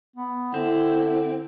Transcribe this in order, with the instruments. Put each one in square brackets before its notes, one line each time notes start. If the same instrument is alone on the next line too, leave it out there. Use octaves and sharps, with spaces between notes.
[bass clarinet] B3
[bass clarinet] D3 [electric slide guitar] C4 [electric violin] E4